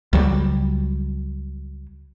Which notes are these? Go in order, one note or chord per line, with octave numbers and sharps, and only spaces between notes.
C#2 F#3 G3